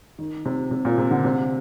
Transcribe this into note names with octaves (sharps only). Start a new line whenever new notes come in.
D#3
C3
C3
A#2
C3
D3
C3